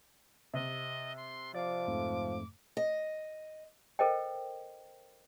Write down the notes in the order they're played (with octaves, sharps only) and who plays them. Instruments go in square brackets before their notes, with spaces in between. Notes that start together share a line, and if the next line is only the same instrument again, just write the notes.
[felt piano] C3 [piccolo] D#5
[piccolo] C6
[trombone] F3 [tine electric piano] D5 F5 [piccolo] D6
[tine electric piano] F2 G#2 A3
[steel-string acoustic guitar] D#5
[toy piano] A4 A#4 C5 D#5 G5